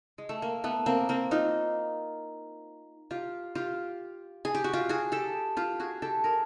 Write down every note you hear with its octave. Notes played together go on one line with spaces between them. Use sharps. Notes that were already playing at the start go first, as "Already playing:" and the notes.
G#3
A3
A#3
A3 B3
A#3 C4
A#3 C4
D#4 F4
F4 G4
F4 G4
G#4
G4
F#4
F4 G4
F#4 G#4
G4 A4
F4 G4
F#4 G#4
G4 A4
G#4 A#4